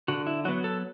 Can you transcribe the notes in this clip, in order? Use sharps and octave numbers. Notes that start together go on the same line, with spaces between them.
D3 F#4
E4
F#3 B3 F#4
A4